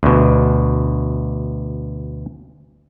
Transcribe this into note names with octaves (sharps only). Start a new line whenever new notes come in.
D2 B2